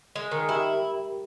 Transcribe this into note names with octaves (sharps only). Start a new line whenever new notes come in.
G#3
D#3 A#4
E4 G4